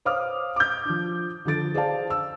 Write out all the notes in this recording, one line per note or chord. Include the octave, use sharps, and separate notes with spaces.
C5 C#5 F5 D6 D#6 F6
D6 G6
F3 D4
D3 F3 A4 A6 D7
G#4 C5 D5 F5 A5
E6